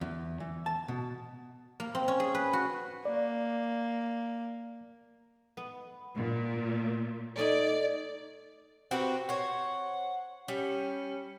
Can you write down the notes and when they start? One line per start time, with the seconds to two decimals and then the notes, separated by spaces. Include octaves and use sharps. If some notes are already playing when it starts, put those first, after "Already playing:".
0.01 E2
0.40 E3
0.66 A5
0.88 B2
1.80 A#3
1.95 C4
2.08 C#4
2.20 G#4
2.35 B4
2.53 F#4
3.05 A#3 D5
5.57 B3
6.16 A#2
7.38 A3 D#4 D5 G#5
8.91 C4 F#4 G4 B4
9.29 C5 C#5 F#5
10.48 G3 C#4